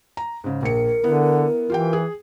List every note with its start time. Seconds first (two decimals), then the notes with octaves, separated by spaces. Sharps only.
0.17 A#5
0.44 G#2 C#3
0.63 A#1 A#4 C#7
1.04 D3 B3 E4
1.70 E3 F4 G4 G5
1.93 G#4